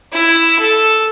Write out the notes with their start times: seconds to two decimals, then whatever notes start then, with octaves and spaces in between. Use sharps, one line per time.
0.12 E4
0.59 A4